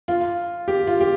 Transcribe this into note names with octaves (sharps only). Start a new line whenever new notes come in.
F4
G4
F4
G4